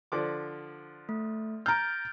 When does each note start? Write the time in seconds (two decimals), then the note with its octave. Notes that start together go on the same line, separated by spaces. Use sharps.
0.12 D3 F3 D6
1.09 A3
1.66 A#5 F6 G6 A6 D7